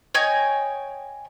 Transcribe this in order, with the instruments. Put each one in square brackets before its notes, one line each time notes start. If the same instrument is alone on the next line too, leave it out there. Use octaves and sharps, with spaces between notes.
[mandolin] C#5 D#5 G5 G#5